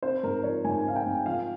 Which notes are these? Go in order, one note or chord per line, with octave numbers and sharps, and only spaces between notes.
C4 C5
G#2 A#4
F3 C#5
G#2 G#5
C4 F5
G5
G#2
F3 F5